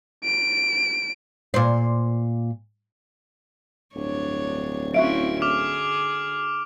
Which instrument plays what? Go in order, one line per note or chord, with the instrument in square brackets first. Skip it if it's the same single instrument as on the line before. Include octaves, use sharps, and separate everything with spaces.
[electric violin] D7
[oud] A#2 C5
[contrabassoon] D1 [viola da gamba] G2 D4 C#5
[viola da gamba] C4 C#4 E4 [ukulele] F#4 E5 F5 [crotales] D7
[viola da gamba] D3 G#4 [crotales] D6 F6 F7